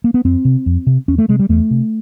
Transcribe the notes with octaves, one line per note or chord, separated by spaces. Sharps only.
A#3
B3
F2 C4
C3
F2
C3
E2 C#4
A3
C3 G#3
G3
E2 A3
C3